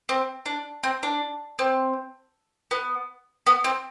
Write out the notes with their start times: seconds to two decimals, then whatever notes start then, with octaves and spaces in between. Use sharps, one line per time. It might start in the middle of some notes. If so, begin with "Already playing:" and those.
0.09 C4
0.46 D4
0.83 C4
1.03 D4
1.59 C4
2.71 B3
3.47 B3
3.64 C4